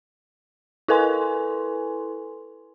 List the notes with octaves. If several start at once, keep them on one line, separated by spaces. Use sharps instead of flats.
E4 A4 B4 G#5 C6